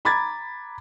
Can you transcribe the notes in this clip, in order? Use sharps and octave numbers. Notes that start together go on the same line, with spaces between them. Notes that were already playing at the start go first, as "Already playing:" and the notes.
A#5 B5 D6 G#6 A6